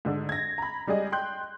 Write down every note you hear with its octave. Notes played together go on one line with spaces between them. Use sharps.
G#2 D3 D4
G#6 A#6
A#5 B5
G3 G#3 G#4 D5 D#5
G5 C6 F#6 G6